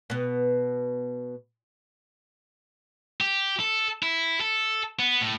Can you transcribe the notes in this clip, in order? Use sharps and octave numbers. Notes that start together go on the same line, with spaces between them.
B2 B3
G4
A4
E4
A4
B3
A2